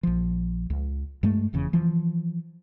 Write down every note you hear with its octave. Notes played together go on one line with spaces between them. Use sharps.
A#1 F3
C#2
G2 G#3 A3
F1 E2 C#3
E3 F3